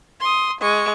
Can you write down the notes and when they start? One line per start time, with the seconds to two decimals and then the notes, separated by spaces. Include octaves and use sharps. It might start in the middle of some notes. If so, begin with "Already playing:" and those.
0.21 C6 D#6
0.61 G#3 C#6